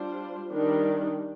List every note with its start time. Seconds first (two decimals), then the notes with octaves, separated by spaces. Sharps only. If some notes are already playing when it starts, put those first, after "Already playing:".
Already playing: G3 D4 F4 C5
0.51 D#3 G3 D4